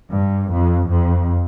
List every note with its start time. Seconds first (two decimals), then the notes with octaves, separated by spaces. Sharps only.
0.11 G2
0.50 F2
0.90 F2